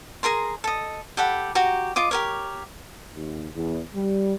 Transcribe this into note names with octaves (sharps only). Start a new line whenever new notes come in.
G#4 A#4 A#5 C6
A4 D#5
G4 A4 F#5 B5
F#4 G4 A#5
F4 D#5 D6
G4 A#4 C#5
D#2
E2
G3